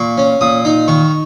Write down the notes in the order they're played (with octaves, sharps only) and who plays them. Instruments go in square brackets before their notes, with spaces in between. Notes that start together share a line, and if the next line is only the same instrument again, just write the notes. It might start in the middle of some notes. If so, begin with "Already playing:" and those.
Already playing: [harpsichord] A#2 C#6
C#4
A#2 D#6
D#4
D#3 C#6